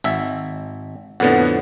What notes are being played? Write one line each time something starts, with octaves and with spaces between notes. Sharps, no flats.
G#1 E5
F2 A2 D3 B3 F#5